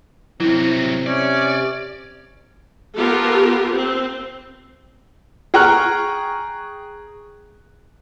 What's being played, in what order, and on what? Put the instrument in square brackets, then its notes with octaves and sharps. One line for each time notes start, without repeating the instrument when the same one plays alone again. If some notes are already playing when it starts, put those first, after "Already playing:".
[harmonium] C3 [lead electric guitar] F#3 C4 [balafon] E4
[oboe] C#4 [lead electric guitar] D5
[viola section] B3 F4 G4 A4 A#4
C4
[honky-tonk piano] G#4 G5 A#5 C#6 F6 F#6